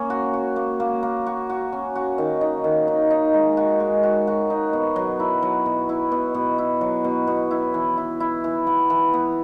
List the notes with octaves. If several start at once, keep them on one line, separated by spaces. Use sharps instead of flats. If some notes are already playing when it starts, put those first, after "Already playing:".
Already playing: A#3 C#4
F#4
F#4
A#3
A#3
A#3
F#4
F#4
C#4
F#4
D#3
D#4
D#3
D#4
D#4
G#3
F#4
G#3
F#4
F#4
D#4
B2
F#3
E4
F#3
B2
E4
B2
B2
E4
F#3
B2
B2
E4
E3
E4
E4
E3
B3
E3
B3